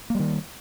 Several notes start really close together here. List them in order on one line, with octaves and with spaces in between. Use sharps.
A#3 G3 D#3